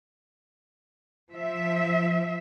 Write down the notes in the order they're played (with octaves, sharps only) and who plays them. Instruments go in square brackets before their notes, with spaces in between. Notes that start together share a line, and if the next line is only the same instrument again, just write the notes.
[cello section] F3 E5